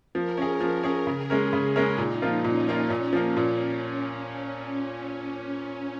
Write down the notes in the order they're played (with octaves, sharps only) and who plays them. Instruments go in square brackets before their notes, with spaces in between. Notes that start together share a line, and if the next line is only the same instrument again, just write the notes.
[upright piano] F3 [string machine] A#4
[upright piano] C#4 G#4
F3
C#4 G#4
[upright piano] C#3 [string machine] G#4
[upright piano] G#3 C#4 A#4
C#3
G#3 C#4 A#4
[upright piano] A#2 [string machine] D#4
[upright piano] F3 A#3 F4
[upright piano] A#2 [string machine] C#4
[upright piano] F3 A#3 F4
[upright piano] A#2 [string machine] C#4
[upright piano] F3 A#3
A#2